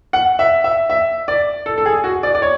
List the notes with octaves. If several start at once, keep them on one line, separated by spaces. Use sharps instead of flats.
F#5
E5
E5
E5
D5
A4
A4
G#4
F#4
D5
D5
C#5